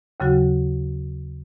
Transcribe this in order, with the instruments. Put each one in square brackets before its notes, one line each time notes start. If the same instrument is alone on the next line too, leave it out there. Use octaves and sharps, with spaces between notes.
[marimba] D#2 C#3 F#3 F#4